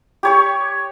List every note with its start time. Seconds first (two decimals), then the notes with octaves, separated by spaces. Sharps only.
0.23 G4 C#5 C#6